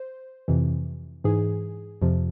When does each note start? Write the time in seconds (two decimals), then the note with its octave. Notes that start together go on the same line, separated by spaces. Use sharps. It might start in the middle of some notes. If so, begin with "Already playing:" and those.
Already playing: C5
0.48 F2 C3 E3
1.24 G#2 E3 G#4
2.02 F2 C3 F3